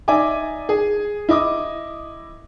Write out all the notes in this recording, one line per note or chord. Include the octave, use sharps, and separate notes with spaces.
D#4 D5 E5 G#5 D6
G#4
E4 D#5 D6 D#6